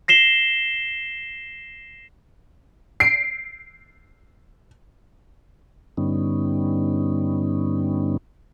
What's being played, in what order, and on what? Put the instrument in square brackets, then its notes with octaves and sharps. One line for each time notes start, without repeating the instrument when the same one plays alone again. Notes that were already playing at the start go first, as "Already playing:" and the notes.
[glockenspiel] A#6 C7 E7 G7
[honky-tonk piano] C7 D7
[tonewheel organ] G2 D3 G3 B3 C#4 D#4